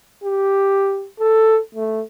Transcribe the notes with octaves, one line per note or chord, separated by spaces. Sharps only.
G4
A4
A3